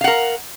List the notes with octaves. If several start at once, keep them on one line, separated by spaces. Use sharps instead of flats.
A#4 F5 F#5